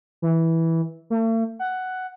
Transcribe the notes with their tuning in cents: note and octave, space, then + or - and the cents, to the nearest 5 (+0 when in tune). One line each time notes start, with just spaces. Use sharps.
E3 -10
A3 +45
F#5 +5